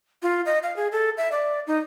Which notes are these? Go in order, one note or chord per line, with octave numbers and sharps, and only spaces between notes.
F4
D#5
F5
G#4
A4
E5
D5
D#4